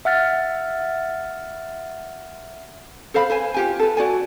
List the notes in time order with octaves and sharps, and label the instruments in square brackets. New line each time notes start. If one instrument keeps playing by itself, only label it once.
[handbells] E5 F#5 F6 A6
[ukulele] A4 C5 F5 B5
B4 C5 G#5
F4 G4 G#5
A4 B4
F#4 D5 G#5